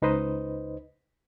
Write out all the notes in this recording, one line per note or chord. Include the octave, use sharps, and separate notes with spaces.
C#2 D#4 B4 C5 D#5